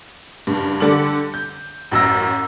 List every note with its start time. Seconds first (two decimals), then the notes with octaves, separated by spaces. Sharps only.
0.47 F#1 G2
0.80 D3 G3 A4 D6 F#7
1.34 G6
1.91 A1 F#2 E6 A#6